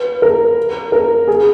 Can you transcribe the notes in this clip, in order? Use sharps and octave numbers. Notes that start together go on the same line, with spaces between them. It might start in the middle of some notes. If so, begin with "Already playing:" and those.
Already playing: B4
A#4
A#4
G#4